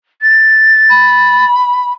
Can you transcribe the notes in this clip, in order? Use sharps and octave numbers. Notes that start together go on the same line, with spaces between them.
A6
B5